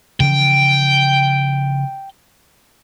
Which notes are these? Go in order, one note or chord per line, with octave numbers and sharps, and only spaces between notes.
C#3 E3 F3 G5